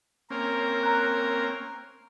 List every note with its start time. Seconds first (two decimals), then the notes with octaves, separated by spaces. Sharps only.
0.30 A#3 C4 C#4 A#4
0.83 A#5 F#6